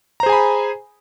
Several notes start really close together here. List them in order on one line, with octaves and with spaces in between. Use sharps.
A#5 C5 G#4 G#5 B5